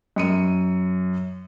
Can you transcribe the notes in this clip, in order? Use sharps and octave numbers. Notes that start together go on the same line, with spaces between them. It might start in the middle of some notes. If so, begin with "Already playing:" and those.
F#2 C#7 D#7